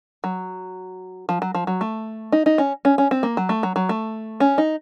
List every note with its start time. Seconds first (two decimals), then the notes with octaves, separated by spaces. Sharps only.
0.24 F#3
1.29 F3
1.42 F#3
1.55 F3
1.67 F#3
1.81 A3
2.32 D#4
2.46 D#4
2.58 C#4
2.85 C#4
2.98 C#4
3.11 C4
3.23 A#3
3.37 F#3
3.49 A3
3.63 F#3
3.76 F#3
3.89 A3
4.40 C#4
4.58 D#4